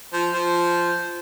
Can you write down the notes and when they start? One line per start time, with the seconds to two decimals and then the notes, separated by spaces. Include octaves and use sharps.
0.13 F3
0.33 F3